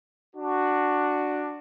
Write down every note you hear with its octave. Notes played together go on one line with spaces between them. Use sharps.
D4 F#4